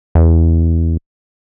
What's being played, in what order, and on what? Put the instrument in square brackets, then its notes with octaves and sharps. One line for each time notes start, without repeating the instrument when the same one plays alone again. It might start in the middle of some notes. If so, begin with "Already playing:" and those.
[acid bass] E2